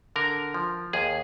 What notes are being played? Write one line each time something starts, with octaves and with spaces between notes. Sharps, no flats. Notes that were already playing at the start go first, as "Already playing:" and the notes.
D3 A#4
F3
D#2 G#4